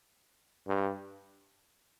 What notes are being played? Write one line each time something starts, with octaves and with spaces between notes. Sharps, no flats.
G2